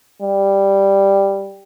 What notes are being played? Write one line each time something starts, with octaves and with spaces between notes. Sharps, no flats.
G3